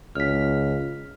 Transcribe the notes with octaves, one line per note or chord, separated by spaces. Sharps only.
C#2 F6 B6